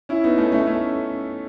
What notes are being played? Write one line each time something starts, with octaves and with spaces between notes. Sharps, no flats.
C#4 E4
B3 D#4
A3 C#4
A3 C#4
A3 C#4